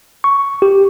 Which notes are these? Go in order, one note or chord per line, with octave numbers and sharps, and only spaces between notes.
C#6
G4